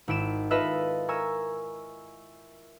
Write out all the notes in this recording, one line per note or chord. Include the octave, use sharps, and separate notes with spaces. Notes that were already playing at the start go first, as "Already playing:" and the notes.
G#1 E4 D7 E7
F4 A4 B4 D#5 E5
A#4 G#5 C#6 E6